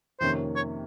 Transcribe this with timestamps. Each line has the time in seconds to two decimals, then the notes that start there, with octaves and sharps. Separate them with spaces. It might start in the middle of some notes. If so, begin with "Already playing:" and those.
0.20 F2 C3 D#3 A#3 C#4 C5
0.56 C#5